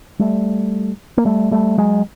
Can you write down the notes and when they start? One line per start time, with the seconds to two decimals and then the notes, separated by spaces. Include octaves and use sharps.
0.19 G3 A3
1.17 A#3
1.25 G3 A3
1.51 G3 A3
1.78 F#3 G#3